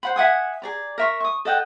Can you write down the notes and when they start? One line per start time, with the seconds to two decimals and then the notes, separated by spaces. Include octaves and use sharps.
0.03 C5 F#5 B5
0.16 E5 F#5 G#5 D#6
0.62 G#4 D5 A#5
0.98 A#4 E5 C#6
1.20 C#6 D#6
1.45 A4 D#5 F#5 G5